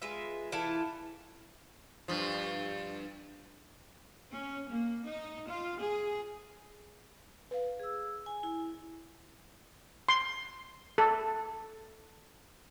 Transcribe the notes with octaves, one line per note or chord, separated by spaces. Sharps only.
G#3 F4 B4 E5
E3 E4 F4 A4
G2 F3
C#4
A#3
D#4
F4
G#4
B4 F5
G#4 E6
G#5
E4
C6
A4